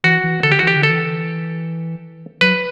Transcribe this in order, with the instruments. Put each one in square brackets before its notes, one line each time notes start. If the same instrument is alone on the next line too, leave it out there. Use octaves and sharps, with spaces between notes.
[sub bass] E3 [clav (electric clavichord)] F#4
[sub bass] E3
[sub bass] D3 [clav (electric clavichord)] A4
[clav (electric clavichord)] G4
F#4
[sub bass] E3 [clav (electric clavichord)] G4
[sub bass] D3
[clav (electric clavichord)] A4
[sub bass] E3
[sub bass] F#3 [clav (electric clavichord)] B4